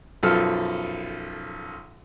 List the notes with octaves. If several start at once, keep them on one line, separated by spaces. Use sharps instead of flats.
B1 F#2 F3 F4 A4 F6